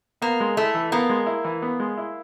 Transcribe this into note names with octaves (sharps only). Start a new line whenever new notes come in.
A#3 B3
G#3
A3 E4
E3
A#3 B3
G#3
E4
E3
B3
G#3
E4